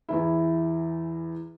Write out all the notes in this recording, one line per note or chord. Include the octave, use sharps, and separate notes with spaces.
E2 E3 E4